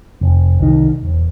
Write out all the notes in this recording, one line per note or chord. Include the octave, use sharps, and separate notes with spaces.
F1
C2 D#3
E1